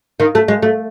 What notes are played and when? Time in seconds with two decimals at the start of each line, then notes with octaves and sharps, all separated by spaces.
0.20 D#3
0.35 A3
0.48 G#3
0.62 A3